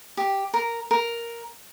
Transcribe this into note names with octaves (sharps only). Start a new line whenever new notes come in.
G4
A#4
A#4